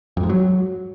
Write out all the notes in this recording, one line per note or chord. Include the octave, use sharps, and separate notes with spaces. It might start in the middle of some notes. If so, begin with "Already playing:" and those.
F2
G#2
F#3